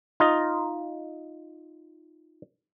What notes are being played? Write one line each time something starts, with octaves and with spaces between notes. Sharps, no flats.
D#4 F4 D#5